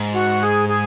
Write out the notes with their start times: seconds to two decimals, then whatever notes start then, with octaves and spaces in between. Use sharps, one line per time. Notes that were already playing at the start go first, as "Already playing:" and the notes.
Already playing: G#2
0.15 F#4 F#5
0.42 G#4 G#5
0.69 G#4 G#5